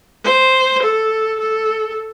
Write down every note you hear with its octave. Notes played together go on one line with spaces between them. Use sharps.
C5
A4
A4